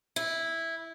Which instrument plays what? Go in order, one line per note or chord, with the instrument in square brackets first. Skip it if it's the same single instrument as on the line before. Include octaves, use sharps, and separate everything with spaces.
[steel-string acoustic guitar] E4